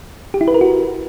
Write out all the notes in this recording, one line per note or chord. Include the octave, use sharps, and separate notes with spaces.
G4
E4
B4
A#4
F#4